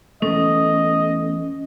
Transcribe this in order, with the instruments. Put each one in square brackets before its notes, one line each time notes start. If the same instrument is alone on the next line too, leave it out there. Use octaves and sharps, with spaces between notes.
[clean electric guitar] E2 G2 A3 [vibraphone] C#4 [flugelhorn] D#5